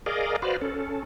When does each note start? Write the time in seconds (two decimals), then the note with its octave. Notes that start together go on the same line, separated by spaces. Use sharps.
0.06 G#4 A#4 D5 D#5 F5
0.42 F#4 B4 C5 D5 F5
0.62 C#4 A4